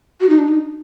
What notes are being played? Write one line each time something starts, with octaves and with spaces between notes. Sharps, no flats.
F#4
D#4
D4
D#4